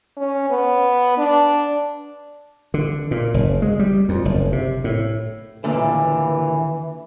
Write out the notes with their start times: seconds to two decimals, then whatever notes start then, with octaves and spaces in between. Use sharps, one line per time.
0.17 C#4
0.50 B3
1.18 D4
2.74 D3
3.11 A#2
3.34 F#1
3.62 G#3
3.79 G3
4.09 F2
4.25 F#1
4.52 C3
4.84 A2
5.64 D#2 A#2 D3 E3